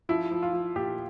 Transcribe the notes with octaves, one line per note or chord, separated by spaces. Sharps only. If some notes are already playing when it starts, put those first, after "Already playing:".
F3 E4
F3
F4
F3
A#2 G4